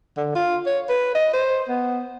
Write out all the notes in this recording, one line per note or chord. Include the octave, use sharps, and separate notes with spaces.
D3
F4
C#5
B4
D#5
C5
B3